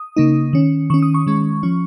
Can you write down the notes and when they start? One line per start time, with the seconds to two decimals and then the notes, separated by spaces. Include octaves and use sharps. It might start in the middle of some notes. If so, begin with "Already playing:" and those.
Already playing: D#6
0.16 C#3 A#3 D#4
0.53 D#3 C#4
0.90 D#3 C#4 C#6
1.02 D#6
1.14 C#6
1.27 D#3 G#3 C#4
1.63 F3 C#4